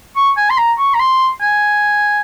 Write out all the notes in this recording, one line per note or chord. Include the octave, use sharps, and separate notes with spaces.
C#6
G#5
C6
A#5
C#6
A#5
C6
G#5